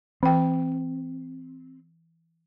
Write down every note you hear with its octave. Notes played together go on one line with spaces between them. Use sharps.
E3 C4 G5